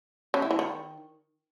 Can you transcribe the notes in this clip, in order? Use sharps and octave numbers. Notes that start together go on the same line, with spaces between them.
C#3
E4
E3
D#3